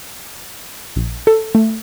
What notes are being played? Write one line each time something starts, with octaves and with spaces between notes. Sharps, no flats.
A#1
A4
A3